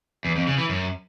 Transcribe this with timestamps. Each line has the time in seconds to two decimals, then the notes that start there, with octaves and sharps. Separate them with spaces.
0.25 E2
0.36 F2
0.47 C#3
0.58 E3
0.69 F#2